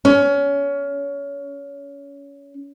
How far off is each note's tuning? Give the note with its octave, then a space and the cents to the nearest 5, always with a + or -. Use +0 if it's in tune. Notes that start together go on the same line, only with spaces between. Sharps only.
C#4 +25